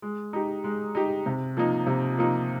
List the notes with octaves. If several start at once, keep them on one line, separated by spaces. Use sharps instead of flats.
G#3
D#4 G4
G#3
D#4 G4
C3
F3 A#3 D#4
C3
F3 A#3 D#4